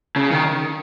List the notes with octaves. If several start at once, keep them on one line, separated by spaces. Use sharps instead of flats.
C#3
D#3